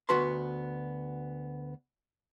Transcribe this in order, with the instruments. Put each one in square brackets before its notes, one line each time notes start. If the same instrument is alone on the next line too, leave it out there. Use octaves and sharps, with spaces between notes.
[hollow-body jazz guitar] D2 B3 F#4 B4 A5 C6